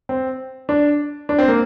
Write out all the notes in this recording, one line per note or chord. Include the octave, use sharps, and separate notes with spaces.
C4
D4
D4
C4
A#3